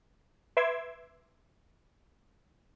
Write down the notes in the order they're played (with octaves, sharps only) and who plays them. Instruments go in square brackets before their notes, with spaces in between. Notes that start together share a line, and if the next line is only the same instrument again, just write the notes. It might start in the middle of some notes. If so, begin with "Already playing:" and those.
[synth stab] B4 E5 C6 D6 E6 G#6